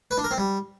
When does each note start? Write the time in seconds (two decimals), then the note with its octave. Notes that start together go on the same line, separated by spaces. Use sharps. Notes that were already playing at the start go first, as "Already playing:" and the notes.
0.11 B4
0.18 D4
0.24 A#4
0.31 C4
0.38 G3